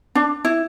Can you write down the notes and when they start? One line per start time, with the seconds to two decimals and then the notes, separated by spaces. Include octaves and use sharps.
0.15 D4
0.45 E4